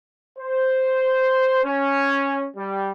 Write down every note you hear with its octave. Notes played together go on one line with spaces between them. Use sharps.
C5
C#4
G3